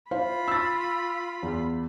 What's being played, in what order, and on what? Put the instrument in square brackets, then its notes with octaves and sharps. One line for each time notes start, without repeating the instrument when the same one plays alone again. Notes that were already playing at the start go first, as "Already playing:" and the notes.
[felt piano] E4 C5 F5 [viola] F4 B5
[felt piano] E6 A6
E2